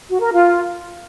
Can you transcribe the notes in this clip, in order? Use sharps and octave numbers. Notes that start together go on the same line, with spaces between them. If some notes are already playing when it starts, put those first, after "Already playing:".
F#4
A#4
F4